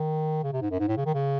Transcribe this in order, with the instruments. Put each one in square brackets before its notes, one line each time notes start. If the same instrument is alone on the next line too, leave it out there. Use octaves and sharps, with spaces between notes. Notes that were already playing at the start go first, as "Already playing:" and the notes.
Already playing: [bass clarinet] D#3
C#3
C3
G#2
F#2
G#2
A2
C#3
D#3
C#3